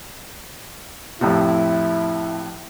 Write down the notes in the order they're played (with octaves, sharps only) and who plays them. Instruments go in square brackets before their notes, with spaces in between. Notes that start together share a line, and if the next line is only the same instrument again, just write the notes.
[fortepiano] F2 A2 C3 [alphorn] E4